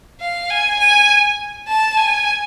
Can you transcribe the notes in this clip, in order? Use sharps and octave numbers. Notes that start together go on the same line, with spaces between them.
F5
G#5
G#5
A5
G#5